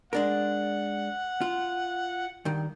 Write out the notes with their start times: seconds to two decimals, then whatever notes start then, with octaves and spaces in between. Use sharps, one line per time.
0.13 G#3 D4 A#4 F#5
1.41 F4
2.45 G2 D#3